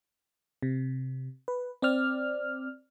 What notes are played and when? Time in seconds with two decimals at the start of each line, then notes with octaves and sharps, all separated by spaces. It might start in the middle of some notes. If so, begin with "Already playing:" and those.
0.62 C3
1.48 B4
1.82 C4 D5 F6